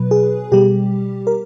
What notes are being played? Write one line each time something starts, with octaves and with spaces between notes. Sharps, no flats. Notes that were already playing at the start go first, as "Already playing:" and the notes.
Already playing: B2 F#3 B4
G#4
B2 G3 G4
A#4